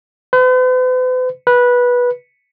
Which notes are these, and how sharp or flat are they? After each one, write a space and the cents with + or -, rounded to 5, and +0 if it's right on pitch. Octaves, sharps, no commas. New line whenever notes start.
B4 +45
B4 -15